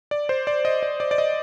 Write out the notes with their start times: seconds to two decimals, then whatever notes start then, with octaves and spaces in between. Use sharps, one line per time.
0.11 D5
0.29 C5
0.47 D5
0.65 D#5
0.83 D5
1.00 D5
1.11 D5
1.18 D#5